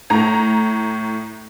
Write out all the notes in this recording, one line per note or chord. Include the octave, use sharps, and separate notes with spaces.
A2 A#5